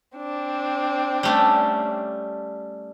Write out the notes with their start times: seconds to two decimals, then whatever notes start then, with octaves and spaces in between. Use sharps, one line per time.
0.17 C4 D4
1.23 G3 A3 C#4